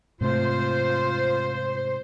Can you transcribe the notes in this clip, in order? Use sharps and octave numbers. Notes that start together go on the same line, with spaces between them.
G#2 C3 A3 F4 C5